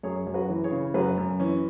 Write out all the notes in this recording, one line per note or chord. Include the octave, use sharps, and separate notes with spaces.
F#2 G#4 C#5
F#2
F#4 B4
E3
G#4 C#5
C#3
F#2 F#4 B4
F#2
E3 C#4